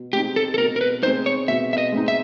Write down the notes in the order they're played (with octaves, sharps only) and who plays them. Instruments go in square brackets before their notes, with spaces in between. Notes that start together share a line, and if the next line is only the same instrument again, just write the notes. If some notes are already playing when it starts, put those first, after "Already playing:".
Already playing: [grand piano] B2
[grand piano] G#3 C4 D#4 [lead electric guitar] G4
[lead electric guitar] A4
A4
[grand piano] B2 [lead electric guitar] A#4
[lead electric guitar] A#4
B4
[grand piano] G#3 C4 D#4 [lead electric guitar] C5
[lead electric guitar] C#5
[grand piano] B2 [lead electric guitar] E5
[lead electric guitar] E5
D#5
[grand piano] G#3 C4 D#4
[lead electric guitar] E5